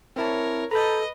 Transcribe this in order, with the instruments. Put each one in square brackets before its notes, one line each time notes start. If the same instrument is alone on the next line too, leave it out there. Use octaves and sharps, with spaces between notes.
[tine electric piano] C4 E4 A5 [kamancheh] A#4 C#5
[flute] A4 [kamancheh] B4 D#5 [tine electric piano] A#5 B5 G6